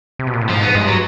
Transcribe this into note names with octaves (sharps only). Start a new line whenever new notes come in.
C3
B2
A#2
A2
G#2 F3
B3
G2 G#3
F#3